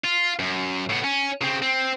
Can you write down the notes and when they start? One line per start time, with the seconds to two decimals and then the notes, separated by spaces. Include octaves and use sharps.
0.04 F4
0.39 F#2
0.90 A2 B3
1.04 C#4
1.41 C#3 C4
1.62 C4